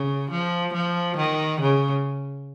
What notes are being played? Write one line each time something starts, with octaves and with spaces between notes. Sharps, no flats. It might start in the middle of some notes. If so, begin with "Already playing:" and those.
Already playing: C#3
F3
F3
D#3
C#3